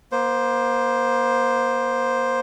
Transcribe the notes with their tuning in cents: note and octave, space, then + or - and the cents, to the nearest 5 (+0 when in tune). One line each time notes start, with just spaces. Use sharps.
A#3 +30 C5 +0